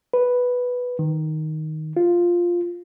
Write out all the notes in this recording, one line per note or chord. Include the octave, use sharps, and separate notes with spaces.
B4
D#3
F4